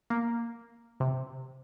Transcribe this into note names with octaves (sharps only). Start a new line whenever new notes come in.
A#3
C3